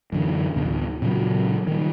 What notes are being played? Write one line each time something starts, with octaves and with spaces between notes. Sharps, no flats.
F#2 D3 E3
A1 D2 B2
A#2 C#3 E3 F#3
D#3 G3